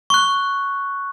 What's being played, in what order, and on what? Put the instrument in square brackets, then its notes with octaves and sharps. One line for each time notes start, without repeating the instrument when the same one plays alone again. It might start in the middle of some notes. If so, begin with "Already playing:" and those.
[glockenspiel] C#6 F#6